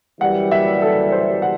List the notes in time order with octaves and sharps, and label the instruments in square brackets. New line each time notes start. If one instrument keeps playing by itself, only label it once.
[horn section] F#2 E3 G3 [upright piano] F#5
[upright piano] E5
A4
C5
F#5